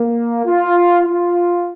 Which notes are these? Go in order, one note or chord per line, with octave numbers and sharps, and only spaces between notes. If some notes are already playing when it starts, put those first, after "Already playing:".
Already playing: A#3
F4
F4